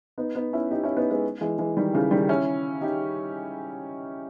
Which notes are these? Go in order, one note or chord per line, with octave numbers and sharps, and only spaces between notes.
B3 D#4
B3 D#4
C#4 E4
D#4 G4
C#4 E4
B3 D#4
G#3 B3
E3 G#3
E3 G#3
D#3 G3
C#3 E3
D#3 G3
C#4 E4
D#4 G4